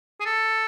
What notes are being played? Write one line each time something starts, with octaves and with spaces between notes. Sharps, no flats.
G#4
A4